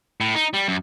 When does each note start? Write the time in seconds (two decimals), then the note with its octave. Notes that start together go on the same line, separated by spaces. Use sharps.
0.21 A2
0.35 D#4
0.54 G3
0.68 F#2